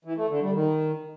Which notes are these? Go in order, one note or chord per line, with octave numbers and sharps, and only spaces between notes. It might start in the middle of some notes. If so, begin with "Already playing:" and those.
E3
A3
D3
G3
D#3